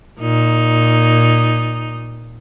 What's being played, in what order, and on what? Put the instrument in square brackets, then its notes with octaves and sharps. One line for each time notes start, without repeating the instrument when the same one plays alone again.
[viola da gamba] A#2 D#4